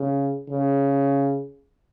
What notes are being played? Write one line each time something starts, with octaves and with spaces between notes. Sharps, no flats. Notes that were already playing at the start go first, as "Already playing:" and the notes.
Already playing: C#3
C#3